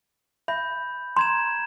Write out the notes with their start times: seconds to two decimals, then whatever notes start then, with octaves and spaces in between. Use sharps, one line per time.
0.48 E5 B5 G6
1.16 A#5 C6 G#6 E7